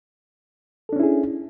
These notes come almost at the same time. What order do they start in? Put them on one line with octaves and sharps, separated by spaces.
A4 D4 C#4 E4 G#4